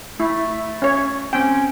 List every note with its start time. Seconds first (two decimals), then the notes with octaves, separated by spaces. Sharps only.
0.20 A3 E4
0.82 C#4 C#5
1.33 C4 C#4 G5